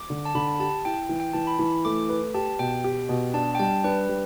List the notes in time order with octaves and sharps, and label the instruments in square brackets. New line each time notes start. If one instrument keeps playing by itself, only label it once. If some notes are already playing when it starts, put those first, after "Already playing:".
Already playing: [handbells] D6
[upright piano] D3
[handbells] A5
[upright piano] D3 [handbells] B5
[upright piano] G4 [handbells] A5
[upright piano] E4 [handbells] G5
[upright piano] E3
[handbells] G5
[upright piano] E3 [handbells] A5
[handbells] B5
[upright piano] E3
[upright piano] A3 [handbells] D6
[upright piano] B4
[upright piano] G4 [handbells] A5
[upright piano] B2 [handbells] G5
[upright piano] G4
B2
[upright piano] D4 [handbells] A5
[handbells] G5
[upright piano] G3 [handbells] A5
[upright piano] D4 [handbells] B4
[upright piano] G3